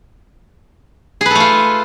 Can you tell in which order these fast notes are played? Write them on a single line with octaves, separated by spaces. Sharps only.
G#4 B4 A4 A3 F4